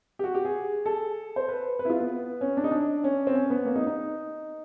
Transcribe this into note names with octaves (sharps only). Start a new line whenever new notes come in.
G4
F#4
G4
G#4
A4
C5
B4
B4
E4
F4
B3
C#4
D4
D#4
D4
C#4
C4
C#4
B3
A#3
D#4
D#4